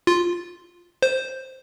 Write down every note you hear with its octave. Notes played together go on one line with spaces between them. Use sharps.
F4
C5